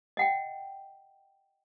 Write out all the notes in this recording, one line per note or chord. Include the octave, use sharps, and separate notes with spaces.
D#5 F#5 G5